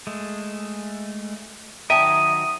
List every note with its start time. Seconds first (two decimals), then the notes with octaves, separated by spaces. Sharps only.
0.07 G#3 A3
1.90 D#3 F#3 A#4 E5 G5 A5 D#6 D#7